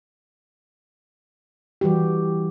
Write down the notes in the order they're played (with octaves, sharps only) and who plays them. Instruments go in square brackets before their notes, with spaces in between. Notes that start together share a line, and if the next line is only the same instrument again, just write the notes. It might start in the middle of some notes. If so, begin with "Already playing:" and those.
[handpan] E3 G3 F#4 G4